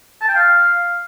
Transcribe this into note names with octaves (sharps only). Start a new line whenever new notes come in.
A5
G5
F5